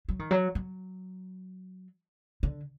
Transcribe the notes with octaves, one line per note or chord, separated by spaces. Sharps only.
F#3
D#3
F#3
F#3
D3